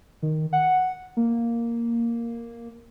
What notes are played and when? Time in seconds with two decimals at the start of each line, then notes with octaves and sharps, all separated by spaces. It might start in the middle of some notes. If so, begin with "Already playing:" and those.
0.23 D#3
0.53 F#5
1.17 A#3